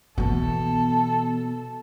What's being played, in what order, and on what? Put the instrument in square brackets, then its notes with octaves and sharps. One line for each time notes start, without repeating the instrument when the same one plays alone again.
[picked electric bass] B2 [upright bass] E3 B3 [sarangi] A4